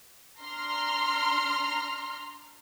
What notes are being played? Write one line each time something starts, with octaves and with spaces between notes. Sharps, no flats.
D4 A#5 C6 F6